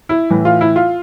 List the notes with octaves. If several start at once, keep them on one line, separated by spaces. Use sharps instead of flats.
E4
A2 E3
F4
E4
F4